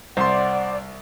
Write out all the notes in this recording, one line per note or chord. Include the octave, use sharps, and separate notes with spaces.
C2 C5 D5 F#5 C6